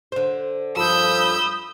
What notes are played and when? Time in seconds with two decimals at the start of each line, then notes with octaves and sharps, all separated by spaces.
0.12 D3 C5
0.77 G2 F3 A4 B5 D#6 E6 G6